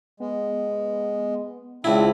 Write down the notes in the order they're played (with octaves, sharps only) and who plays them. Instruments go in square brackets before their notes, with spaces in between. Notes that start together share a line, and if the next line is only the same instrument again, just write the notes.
[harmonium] G#3 [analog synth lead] B3
[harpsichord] C#2 E4 [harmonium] C4 D4 [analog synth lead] G#6